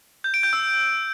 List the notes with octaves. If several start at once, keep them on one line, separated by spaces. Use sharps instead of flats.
G6
D7
G6
E6